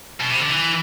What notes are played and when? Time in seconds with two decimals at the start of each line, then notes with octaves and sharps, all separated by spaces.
0.20 B2
0.30 C3
0.40 D3
0.50 E3